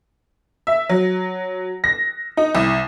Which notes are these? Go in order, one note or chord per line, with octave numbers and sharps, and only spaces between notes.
E5
F#3
A#6
D#4
C2